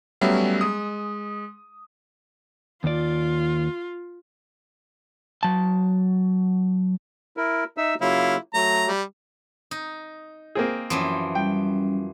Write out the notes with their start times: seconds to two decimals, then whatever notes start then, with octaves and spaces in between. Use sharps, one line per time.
0.21 F#3 G3 A3 B3 C#4 E5
0.61 G#3 D#6
2.84 D#2 F4 D5
5.43 F#3 A5
7.37 E4 A#4
7.77 D#4 E5 E6
8.01 C#3 F#3 A#3 E4 F4 F5
8.54 F#3 A3 A#5
8.88 G3
9.71 D#4
10.55 A#3 C4 G#4
10.90 F#2 E3 F3
11.35 G3 C#4 G5